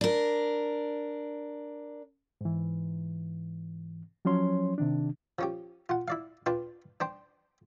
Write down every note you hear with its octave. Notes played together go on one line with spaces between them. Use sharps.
D4 A#4
G#2 E3
F3 F#3 C#4 C#5 C6
C3 D#3 D4
F3 C#4 G4
F4 F#5
E4 D5 F5
D4 F4 B4 D5 G5
D4 C5 G5